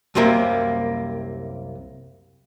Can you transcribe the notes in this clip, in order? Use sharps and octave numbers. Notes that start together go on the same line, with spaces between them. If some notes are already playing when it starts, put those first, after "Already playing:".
C2 F#2 C3 G3 A#3 E5